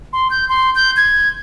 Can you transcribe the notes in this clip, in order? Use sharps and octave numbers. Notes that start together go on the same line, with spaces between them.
C6
G6
C6
G6
G#6